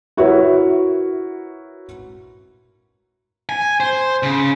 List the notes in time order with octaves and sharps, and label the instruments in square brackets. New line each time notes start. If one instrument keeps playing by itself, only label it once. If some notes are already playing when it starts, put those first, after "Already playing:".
[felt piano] E4 F#4 A#4 B4 C#5 E5
[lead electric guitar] G#5
C5
C#3